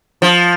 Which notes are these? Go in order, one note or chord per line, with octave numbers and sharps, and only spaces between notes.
F3